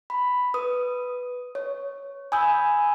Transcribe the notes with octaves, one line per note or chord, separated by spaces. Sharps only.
B5
B4 D#6
C#5
G#5 B5 D#6 E6 G6